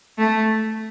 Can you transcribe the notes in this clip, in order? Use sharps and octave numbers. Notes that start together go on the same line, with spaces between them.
A3